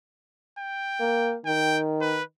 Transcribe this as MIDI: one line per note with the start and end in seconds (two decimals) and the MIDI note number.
0.59 1.35 79
1.00 1.36 58
1.46 2.19 51
1.46 1.80 79
2.01 2.24 71